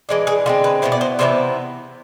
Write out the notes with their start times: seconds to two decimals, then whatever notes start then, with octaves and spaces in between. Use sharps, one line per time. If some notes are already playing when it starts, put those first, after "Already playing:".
0.09 E3 G#3 D4
0.27 G#4
0.46 D3 G#3 C4 F4
0.64 B4
0.82 B2 B3 E4 C5
0.92 D5
1.01 C5
1.19 C3 E3 B3 E4 C5